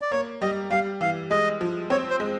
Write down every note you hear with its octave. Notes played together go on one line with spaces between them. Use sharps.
D5
A#3 C#5
G3 D#5
G3 F5
E3 F5
G#3 D#5
F3
C4 C#5
C5
G#3